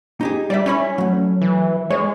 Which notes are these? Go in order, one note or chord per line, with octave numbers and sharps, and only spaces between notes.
D#4 G4 G#4
G3 D5 E5
C#4 E4 C#5 B5
F#3 A3
E3
G#3 C#5